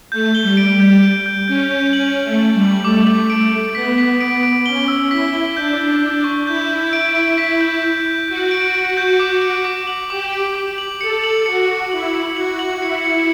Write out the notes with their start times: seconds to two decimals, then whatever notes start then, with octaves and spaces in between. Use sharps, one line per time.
0.12 A3 G6
0.35 G7
0.43 G3
0.57 D7
0.73 G3
0.80 G6
1.03 D7
1.26 G6
1.48 C#4 G6
1.71 G6
1.93 C#4 F#7
2.16 F#7
2.24 A3
2.39 F#7
2.54 G3
2.62 F#7
2.84 A3 D6
3.07 F#7
3.30 D7
3.52 F#7
3.75 B3 B6
3.98 B6
4.20 D7
4.43 D7
4.66 C#4 G7
4.88 E6
5.11 E4 B6
5.33 G7
5.56 D4 G6
5.79 G6
6.01 G6
6.24 C#6
6.47 E4 G6
6.70 G6
6.93 D7
7.15 D7
7.38 B6
7.61 G6
7.83 G6
8.06 G6
8.28 F#4 G6
8.51 D7
8.74 D7
8.97 G6
9.19 D6
9.42 D7
9.64 D6
9.87 F#7
10.10 G4 D6
10.32 D7
10.55 D6
10.78 F#7
11.01 A4 C#7
11.24 F#7
11.46 F#4 C#7
11.69 F#7
11.92 E4 F#7
12.14 C#7
12.37 F#4 F#7
12.59 F#7
12.82 E4 C#7
13.05 C#7